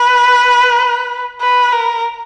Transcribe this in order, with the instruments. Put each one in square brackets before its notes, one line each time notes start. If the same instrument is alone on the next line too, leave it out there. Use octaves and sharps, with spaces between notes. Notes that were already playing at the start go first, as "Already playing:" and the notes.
Already playing: [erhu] B4
B4
A#4